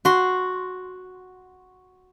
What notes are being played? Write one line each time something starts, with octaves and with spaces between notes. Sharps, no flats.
F#4 C6